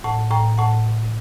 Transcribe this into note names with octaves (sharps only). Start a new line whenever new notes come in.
A2 F#5 A5
A2 G5 A#5
A2 F#5 A5